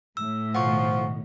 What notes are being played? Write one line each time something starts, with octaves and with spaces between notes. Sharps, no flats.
A2 E6
B2 D#3 F3 F#5 C#6